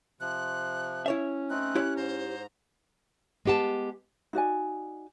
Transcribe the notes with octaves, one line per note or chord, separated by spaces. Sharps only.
C3 F3 F#6
C#4 E4 C#5 E5
A3 C4 D#4 F#6
E4 G4 C#5
G#2 C5 A#5
G#3 B3 G4 F#5 A5
D#4 F#4 D5 G#5